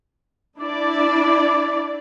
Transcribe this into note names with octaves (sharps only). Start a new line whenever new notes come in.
D4 E4 D5